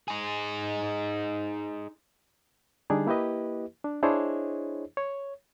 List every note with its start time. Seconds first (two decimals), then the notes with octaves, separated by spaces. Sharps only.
0.08 D#4 G#4
2.90 D3 G3 D4 D#4 G#4
3.06 A#3 E4 G4 B4 D#5
3.84 D4
4.03 D4 E4 G#4 C5 C#5 D#5
4.97 C#5